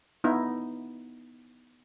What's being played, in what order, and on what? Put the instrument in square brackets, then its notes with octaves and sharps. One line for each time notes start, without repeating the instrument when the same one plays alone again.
[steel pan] B3 D#4 E4